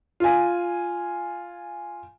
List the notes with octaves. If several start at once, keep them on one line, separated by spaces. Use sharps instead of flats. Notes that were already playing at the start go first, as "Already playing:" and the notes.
F4 G#5